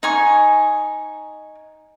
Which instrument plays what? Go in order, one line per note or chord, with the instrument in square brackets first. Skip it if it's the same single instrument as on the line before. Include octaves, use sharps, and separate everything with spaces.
[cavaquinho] D#4 G#5 C#6